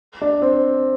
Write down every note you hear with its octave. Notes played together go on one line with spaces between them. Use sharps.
D4
C4